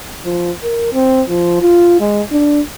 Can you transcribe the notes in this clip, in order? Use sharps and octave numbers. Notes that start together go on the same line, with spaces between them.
F3
A#4
C4
F3
F4
G#3
D4